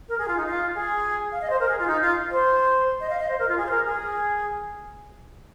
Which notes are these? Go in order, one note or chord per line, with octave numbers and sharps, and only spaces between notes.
A#4
G#4
F4
D#4
F4
G#4
F5
D#5
C5
A#4
G#4
F4
D#4
F4
C5
D#5
F5
D#5
C5
A#4
F4
G#4
C5
A#4
G#4